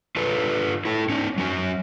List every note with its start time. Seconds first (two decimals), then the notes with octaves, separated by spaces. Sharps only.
0.16 F4 A4 B4
0.85 E4 A4
1.09 C#4 D#4
1.38 F#3 C#4 F#4